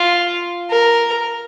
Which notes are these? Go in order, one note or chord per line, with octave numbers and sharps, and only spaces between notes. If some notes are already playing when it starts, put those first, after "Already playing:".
Already playing: F4
A#4